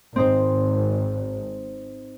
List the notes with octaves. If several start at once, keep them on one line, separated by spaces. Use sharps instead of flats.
G#1 C4 D#4 C5